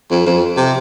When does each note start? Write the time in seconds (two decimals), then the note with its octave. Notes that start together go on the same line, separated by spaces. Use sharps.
0.11 F2
0.26 F2
0.57 C3